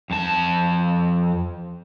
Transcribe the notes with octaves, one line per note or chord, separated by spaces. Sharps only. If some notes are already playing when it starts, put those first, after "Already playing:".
F2 A5